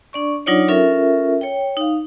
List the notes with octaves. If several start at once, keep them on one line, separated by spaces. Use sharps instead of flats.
D4 D5 C#6
F#3 D4 D#4 F4 C#5 D5
C#4 F4 A4 A#4 E5
C#5 G5
D#4 F5